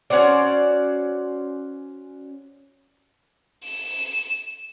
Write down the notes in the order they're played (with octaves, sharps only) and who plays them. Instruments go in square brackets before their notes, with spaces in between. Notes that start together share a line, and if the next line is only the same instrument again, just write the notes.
[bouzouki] C#4 F#4 C5 D5
[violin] E7